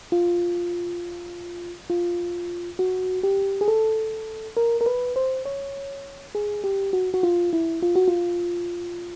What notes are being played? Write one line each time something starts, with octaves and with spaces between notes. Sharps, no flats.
F4
F4
F#4
G4
G#4
A4
A#4
A#4
B4
C5
C#5
G#4
G4
F#4
F#4
F4
E4
F4
F#4
F4